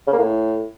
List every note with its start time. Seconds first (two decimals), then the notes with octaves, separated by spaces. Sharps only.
0.07 C#3
0.13 A#3
0.18 A2